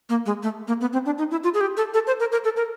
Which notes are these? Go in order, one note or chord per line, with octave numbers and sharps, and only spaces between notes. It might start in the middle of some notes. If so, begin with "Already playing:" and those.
A#3
G#3
A3
A#3
B3
C4
D4
D#4
E4
F4
G#4
G4
A4
A4
C5
A#4
A#4
A4
A#4